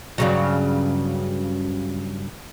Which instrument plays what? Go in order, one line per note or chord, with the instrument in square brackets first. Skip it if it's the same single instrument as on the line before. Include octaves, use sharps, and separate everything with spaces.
[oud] G2 C#3 F#3